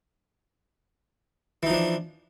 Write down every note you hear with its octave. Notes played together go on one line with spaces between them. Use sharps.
E3 F3 D4 D#4